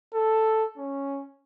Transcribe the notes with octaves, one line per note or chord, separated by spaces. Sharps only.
A4
C#4